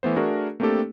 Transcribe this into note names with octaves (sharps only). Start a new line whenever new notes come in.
E3 A3 B3 C5
A3 D4 F#4 G#4 A#4
A3 A#3 C4 D4 G4 A4